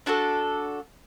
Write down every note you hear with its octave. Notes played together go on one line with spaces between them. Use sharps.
D4 F#4 A4 A5